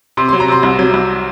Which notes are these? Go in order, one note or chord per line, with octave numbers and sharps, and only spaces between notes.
C3 C6
F#3 C6
A#5
C3 C6
C2
F#3
C2